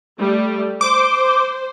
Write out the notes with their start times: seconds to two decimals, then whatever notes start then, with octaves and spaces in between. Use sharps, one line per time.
0.19 G3 A3
0.81 C5 D6